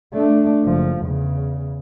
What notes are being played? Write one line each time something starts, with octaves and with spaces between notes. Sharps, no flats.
A3 D4
F#1 F3
E2 C#3